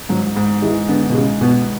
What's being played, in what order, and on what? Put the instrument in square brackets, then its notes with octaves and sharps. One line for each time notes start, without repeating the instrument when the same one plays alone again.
[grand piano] G#2 [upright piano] F#3
[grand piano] G#2
[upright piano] E3 [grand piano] G#3
[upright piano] D3 [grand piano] B3
[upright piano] B2
[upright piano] C#3 [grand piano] G#3
[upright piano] B2 [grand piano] B3